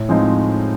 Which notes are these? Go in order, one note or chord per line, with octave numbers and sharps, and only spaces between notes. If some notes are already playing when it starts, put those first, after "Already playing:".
Already playing: A2
F3 G#3 C4 D#4